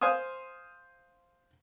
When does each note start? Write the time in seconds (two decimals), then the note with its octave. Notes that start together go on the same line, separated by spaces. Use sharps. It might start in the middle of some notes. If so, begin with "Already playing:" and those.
0.01 C5 F5 G#5 C6 D#6